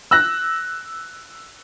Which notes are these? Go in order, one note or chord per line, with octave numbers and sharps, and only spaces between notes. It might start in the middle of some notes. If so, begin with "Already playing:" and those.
E6 F#6 A#6